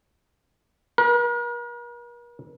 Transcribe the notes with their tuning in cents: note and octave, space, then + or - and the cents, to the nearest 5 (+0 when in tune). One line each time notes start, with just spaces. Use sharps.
A#4 +45